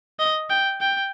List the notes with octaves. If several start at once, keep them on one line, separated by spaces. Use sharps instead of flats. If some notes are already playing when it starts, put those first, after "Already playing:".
D#5
G5
G5